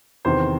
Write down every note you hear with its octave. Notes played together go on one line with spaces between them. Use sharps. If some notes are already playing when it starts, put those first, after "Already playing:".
E2 C3 D#3 C5